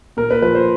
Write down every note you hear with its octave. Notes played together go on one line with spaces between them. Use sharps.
A#2 A#4
B4
F3 B4
C5